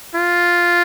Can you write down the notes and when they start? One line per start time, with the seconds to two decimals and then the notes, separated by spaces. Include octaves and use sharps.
0.15 F4